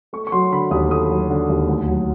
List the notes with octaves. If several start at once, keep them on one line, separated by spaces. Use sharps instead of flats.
A3 C#6
C#6
F#3 C6
D3 B5
D#2 D#6
A3 D#6
F#3
D3
D#2
D2
F#3